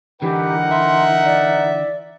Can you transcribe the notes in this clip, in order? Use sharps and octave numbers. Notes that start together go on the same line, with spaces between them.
D3 E3 D#4 G4 A#4 F#5
E5 C6
D5